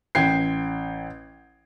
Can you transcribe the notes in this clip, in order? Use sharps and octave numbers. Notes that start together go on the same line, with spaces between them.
A1 G5 G#6 C7